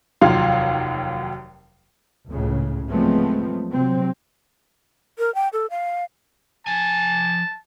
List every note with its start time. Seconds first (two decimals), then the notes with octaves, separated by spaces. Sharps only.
0.21 F1 D#2 F#3 F4 F5 C6
2.28 G#1 C#2 A2 C#3
2.90 F3 F#3 G#3 A3 B3 C4
3.71 C3 F#3 C4
5.18 A#4
5.35 G5
5.53 A4
5.70 F5
6.67 F3 G#5 A5